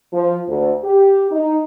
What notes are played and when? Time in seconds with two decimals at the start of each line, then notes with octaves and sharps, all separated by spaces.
0.13 F3
0.49 D2
0.84 G4
1.31 D#4